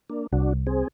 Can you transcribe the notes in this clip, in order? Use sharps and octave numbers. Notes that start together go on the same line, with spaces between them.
A#3 D4
C2 D4 F#4
C4 G#4